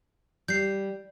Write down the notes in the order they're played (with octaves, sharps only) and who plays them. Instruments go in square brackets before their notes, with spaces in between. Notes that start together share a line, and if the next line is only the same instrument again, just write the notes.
[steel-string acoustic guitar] G3 [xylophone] G6 C7